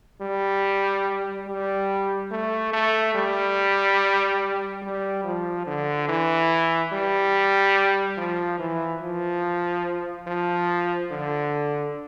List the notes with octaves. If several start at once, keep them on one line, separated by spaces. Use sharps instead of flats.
G3
G3
A3
A3
G3
G3
F3
D3
E3
G3
F3
E3
F3
F3
D3